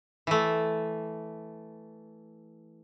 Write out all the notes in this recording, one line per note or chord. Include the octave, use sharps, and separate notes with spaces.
E3 A3